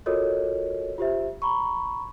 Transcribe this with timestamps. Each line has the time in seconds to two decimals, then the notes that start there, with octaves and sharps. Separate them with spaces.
0.06 F4 F#4 A4 A#4 C#5 D#5
0.98 F4 G4 C5 E5
1.42 A#5 B5 C#6